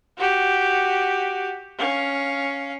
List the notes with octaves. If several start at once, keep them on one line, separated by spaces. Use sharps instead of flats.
F#4 G4
C#4 F5